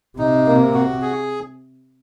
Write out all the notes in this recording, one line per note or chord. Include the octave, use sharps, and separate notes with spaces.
C3 D#4
A#3
F#4
G#4